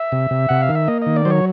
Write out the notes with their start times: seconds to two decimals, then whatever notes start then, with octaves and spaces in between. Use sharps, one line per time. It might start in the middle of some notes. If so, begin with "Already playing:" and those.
Already playing: E5
0.12 C3
0.31 C3
0.49 C3 F#5
0.62 F5
0.69 D#3
0.75 E5
0.88 A#3 D#5
1.02 D#3 D#5
1.16 D5
1.25 F#3 C5
1.30 C#5